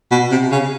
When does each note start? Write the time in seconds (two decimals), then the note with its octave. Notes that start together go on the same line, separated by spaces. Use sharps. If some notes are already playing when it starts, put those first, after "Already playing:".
0.11 B2
0.31 C3
0.52 C#3